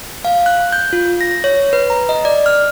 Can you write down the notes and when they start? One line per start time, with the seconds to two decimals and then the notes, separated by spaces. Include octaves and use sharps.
0.25 F5
0.46 F#6
0.72 G6
0.93 F4
1.21 A#6
1.44 C#5
1.73 B4
1.90 A#5
2.09 D#5
2.25 D5
2.46 F6